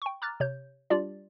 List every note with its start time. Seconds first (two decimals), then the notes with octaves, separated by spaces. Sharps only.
0.02 G5 C#6
0.22 A#5 D6 F6 F#6 A6
0.40 C3 C#5 G6
0.90 G3 D4 F4 G4 D5